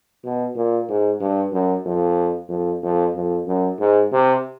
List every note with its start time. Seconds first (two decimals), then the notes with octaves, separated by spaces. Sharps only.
0.24 B2
0.56 A#2
0.89 G#2
1.20 G2
1.52 F#2
1.86 F2
2.49 F2
2.83 F2
3.15 F2
3.47 F#2
3.80 G#2
4.12 C3